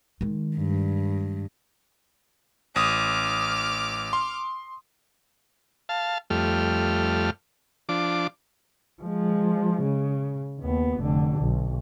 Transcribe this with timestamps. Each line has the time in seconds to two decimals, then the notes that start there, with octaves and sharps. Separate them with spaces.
0.21 D#3 G#3
0.56 G2
2.76 A1 D6 D#6 F6
4.13 C6
5.89 F5 A5
6.30 F2 G3 A3 F6
7.89 F3 D4 D6
9.02 F3 G#3
9.82 C#3
10.60 D#2 B3
11.00 F1 D3
11.38 B1